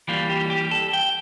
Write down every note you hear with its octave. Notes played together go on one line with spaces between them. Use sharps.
E3 G3 A#3 F4
G4
G4
A4
G5